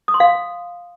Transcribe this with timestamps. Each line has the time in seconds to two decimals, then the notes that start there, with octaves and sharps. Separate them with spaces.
0.08 D#6
0.14 C6
0.20 F5